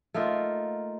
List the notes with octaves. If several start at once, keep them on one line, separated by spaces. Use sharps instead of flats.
A3 A#3 D#4 F4